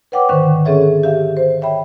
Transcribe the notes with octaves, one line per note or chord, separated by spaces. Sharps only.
B4 C#5 F#5 G5 D6
G#2 D3 D#3 C5 C#6
C4 C#4 G#4 A4 C#5 E5
G4 E5 F5
C5
C#5 E5 G5 B5